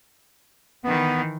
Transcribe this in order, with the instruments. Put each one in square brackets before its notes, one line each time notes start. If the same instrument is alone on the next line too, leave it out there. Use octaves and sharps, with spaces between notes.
[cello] D#3 E3 [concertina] B3